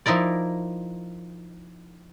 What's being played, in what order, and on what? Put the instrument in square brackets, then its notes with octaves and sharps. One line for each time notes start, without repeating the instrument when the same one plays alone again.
[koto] F3 D#4 E4 A#4 D5